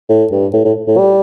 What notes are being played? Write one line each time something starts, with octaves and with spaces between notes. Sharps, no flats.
A2
G2
A2
A2
A2
G3